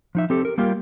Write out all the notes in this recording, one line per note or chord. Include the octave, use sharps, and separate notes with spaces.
F3 D#4 E5
C4 G4 A4
A#4
G3 A#3 F4 G4